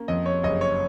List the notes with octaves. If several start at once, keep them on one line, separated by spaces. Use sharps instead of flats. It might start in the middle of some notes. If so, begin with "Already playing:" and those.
Already playing: A#3 C#4
F2 D#5
C#5
F#1 D#5
C#5